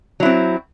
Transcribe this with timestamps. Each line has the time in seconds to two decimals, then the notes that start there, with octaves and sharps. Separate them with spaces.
0.20 F#3
0.23 E4
0.25 C4